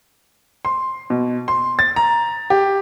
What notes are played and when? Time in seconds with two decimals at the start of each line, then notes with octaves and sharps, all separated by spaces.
0.65 C6
1.10 B2
1.48 C6
1.79 A6
1.96 A#5
2.50 G4